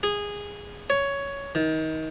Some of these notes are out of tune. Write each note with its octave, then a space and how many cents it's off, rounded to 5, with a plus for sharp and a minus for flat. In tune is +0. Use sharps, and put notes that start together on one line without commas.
G#4 -15
C#5 +10
D#3 +25